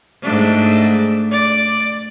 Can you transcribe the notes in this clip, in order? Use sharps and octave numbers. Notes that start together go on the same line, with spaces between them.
G#2 A3 D4
D5